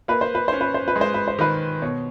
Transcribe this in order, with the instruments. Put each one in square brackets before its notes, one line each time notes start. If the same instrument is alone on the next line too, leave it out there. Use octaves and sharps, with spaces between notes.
[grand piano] A#3 [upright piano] B4
[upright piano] C5
B4
[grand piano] C#4 [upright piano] C5
[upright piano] B4
C5
B4
[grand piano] G#3
[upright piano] C5
B4
C5
[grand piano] D#3 [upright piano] B4
[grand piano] B2 [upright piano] C#5